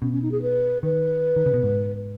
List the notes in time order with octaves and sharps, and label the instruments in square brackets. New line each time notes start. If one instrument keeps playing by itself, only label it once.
[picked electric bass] B2 [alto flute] C#4
[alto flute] C#4
D#4
G#4
B4
[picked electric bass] D#3 [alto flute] B4
[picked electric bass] D#3
C#3
B2
G#2